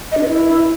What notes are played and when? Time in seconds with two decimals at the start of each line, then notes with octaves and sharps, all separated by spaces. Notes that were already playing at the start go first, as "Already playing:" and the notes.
0.12 D#5
0.17 D4
0.23 B4
0.29 E4